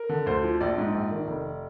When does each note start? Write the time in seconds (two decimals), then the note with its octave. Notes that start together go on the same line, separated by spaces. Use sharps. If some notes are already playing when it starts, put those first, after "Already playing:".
Already playing: A#4
0.09 D3
0.26 D2 C5
0.43 F3
0.60 A#1 D5
0.78 G#2
0.94 A#1
1.11 D#3
1.28 F1